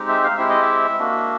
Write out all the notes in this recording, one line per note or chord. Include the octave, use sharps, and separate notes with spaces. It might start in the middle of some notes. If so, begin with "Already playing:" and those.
Already playing: G#3 C4 D#4 G4
E5
F5
G#3 C4 E4 G4 E5
D#5
E5
A#3 D4 F#4